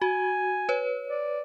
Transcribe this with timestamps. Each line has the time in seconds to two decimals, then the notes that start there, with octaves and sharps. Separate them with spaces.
0.02 F#4 G#5
0.69 B4 C#5
1.09 D5